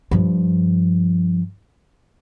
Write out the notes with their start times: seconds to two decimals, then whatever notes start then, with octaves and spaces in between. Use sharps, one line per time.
0.11 G2 F3